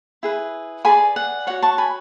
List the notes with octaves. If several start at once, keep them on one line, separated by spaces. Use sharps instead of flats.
E4 G#4 B4
G#4 B4 D5 G#5 B5
F#5
F#4 C#5 F#5
A5 C#6
G#5 B5